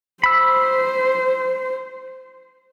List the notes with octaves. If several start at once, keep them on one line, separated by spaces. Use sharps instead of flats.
C5 B5 E6